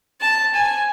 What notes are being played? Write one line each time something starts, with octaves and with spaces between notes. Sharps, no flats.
A5
G#5